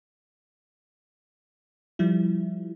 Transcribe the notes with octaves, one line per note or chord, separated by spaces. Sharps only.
F3 G3 E4